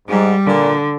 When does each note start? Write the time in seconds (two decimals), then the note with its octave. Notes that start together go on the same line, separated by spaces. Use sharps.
0.08 G#2 G3
0.46 A#2 D3